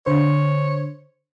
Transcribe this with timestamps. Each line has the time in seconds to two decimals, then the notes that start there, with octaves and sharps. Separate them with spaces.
0.06 D3 C5 C#5